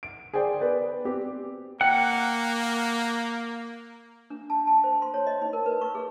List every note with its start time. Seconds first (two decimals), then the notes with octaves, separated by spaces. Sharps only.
0.03 D7
0.33 G#4 C5 D5 G5
0.61 B3 B4 D5
1.05 C4 G4
1.81 A#3 F#5 G5
4.30 D4
4.50 A5
4.67 A5
4.84 C5
5.02 C6
5.14 C#5
5.27 D#5
5.42 D#4
5.53 A#4
5.66 B4
5.81 C#6
5.95 G#4